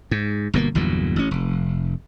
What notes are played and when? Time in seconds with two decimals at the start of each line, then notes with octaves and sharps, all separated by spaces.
0.11 G#2
0.54 G1 B2 D3 A#3
0.75 G1 E2 A#2 F#3
1.16 A1 C#4
1.31 F1